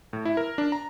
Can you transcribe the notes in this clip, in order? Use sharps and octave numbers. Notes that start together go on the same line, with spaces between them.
A2
E4
A#4
D4
A#5